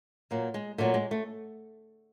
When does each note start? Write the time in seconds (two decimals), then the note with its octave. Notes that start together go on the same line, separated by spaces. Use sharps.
0.31 A#2 F#3 A#3
0.54 G#3
0.78 A#2 F#3 A3
0.94 G#3
1.11 A3